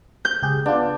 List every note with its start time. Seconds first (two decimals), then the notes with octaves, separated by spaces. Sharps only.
0.25 G6
0.42 C#2 G4 G#4
0.66 B3 D4 F4